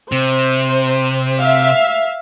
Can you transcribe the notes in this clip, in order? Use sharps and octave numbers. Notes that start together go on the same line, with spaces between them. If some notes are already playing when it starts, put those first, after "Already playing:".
C3 C5
E5 F5